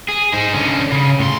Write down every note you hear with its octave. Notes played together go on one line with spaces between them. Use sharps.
G#4
D#4 C5
D3 C#4
C#3
A2 C6